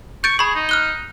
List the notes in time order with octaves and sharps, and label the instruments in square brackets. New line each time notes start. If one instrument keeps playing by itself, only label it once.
[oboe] C#6 [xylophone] G6 A6 D7
[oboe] G#4 [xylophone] B5 C#6
[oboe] D#4
[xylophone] F6 F#6 G7